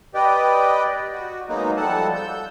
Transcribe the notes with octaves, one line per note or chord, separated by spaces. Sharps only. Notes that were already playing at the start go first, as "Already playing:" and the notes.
G4 B4 D5 D#5 G5
F#4
F#3 G#3 A#3 B3 D#4
F3 G3 A4 F#5 A5
E6 G6